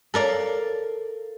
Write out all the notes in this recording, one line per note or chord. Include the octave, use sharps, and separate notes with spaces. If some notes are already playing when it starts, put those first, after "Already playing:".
A4 A#4 D5 F5